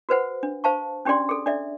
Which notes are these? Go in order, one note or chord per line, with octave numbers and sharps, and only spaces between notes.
F#4 B4 C5 F#5
D4
C5 F5 A5 C#6
C#4 D4 G4 G#4 D5 C6
G#4 A4
D4 D5 E5